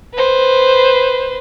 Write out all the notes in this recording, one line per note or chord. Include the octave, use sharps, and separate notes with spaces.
B4 C5